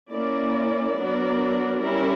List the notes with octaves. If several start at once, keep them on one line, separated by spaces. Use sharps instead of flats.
A#3 C#4 E4 A#4 D5
F#3 B3 D4 A#4 D5
G3 C#4 E4 A#4